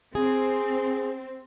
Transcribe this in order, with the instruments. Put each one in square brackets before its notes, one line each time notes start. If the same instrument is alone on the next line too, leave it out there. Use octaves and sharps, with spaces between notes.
[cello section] C4 [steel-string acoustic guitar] G#4